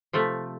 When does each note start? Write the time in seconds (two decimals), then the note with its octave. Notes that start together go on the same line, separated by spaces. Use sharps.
0.13 C3 F3 A3